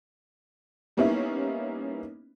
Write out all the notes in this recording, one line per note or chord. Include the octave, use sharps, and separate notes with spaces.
G3 A#3 B3 C#4 D#4 E4